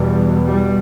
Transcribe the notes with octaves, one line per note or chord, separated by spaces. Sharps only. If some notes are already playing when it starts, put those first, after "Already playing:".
Already playing: E2 B2 G3
G3